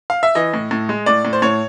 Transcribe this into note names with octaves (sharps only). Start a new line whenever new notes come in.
F5
E5
E3 D#5
A2
A2
G#3
A2 D5
A2
C5
A2 C#5